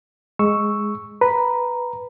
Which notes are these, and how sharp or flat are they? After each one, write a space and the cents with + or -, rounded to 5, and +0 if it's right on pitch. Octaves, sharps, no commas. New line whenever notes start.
G#3 +0 C#6 +0 E6 +0
B4 +0 A#5 +0